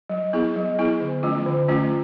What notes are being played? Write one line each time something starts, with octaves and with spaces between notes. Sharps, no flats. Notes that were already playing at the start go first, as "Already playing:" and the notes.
F#3
B3 E4 G#4
F#3
B3 E4 G#4
D3
F3 A3 C#4 F4
D3
F3 A3 C#4 F4